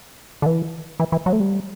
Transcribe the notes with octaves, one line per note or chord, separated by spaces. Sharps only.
D3
E3
E3
E3
F#3
A3
G3